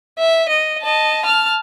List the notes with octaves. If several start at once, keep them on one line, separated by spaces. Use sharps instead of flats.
E5
D#5
D#5 A5
A5 F6